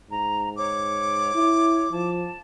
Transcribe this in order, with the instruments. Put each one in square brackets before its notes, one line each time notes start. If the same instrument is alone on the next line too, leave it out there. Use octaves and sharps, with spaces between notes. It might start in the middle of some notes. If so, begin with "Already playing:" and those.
[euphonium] G#2 [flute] A#5
[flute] C#5 [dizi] D6
[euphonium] E4
[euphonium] F3 [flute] A5